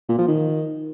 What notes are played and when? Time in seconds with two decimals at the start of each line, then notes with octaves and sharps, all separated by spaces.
0.09 A#2
0.18 F3
0.28 D#3